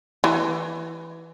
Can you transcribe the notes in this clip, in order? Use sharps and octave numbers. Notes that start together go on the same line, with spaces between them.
E3